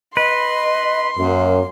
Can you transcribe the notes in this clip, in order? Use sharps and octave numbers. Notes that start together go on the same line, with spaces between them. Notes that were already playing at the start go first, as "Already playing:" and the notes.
B4 D#5 C6
F#2 A#3